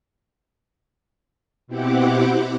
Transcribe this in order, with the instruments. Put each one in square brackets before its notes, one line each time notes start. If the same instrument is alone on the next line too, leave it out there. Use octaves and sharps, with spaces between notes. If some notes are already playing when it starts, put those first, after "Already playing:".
[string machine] B2 C4 E4 G4 F#5 D6